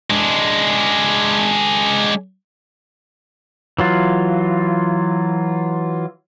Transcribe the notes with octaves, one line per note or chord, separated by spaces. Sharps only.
G#3 D4
E3 F#3 F4